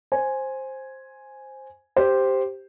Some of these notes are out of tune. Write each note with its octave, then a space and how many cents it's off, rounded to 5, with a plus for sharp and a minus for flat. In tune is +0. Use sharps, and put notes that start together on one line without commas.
C5 +10 G#5 +0
G4 +0 C5 +0